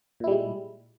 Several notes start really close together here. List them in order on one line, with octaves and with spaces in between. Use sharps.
A#2 E4 G3 G#3